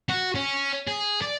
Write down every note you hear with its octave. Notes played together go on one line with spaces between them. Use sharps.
F#4
C#4
G#4
D5